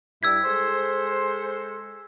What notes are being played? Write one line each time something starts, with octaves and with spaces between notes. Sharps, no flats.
G2 G3 E4 E6 G#6 B6
G#3 A4 C5